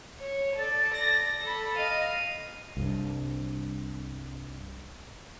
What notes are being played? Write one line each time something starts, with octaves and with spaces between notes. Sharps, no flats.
C#5
A4 D5
A#6
A4 B5
D#5 F5 D#7
C2 G2